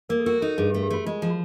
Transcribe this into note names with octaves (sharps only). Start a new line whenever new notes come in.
A#3 A#4
A4
F#4 A#4
D#4 A4
G2 G#4
G4
A3
G4
A3 F#4
G#3 F4
F3
F#4